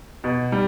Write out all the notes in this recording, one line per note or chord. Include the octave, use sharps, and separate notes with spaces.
B2
G3